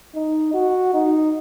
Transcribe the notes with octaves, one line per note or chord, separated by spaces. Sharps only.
D#4
F#4
D#4